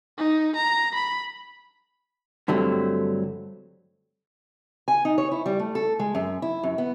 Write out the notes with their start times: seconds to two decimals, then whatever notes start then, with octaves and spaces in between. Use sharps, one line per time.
0.17 D#4
0.56 A#5
0.94 B5
2.48 G2 D3 F#3 A3 C4
4.88 G#5
5.05 D#4
5.18 C#5
5.31 E4
5.46 G3
5.59 A3
5.75 A4
5.99 G#3
6.15 F#2
6.42 E4
6.64 F#2
6.78 B3